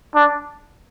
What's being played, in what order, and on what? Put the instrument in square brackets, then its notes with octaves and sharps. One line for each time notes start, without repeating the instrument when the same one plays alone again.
[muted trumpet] D4